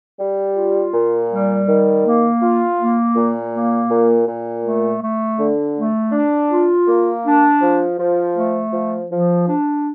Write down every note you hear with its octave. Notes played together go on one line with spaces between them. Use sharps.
G3
F4
A#2
G3
D#3
A#3
F4
A#3
A#2
A#3
A#2
A#2
A3
A3
D3
A3
D4
F4
A#3
D4
F3
F3
A3
F3
F3
D4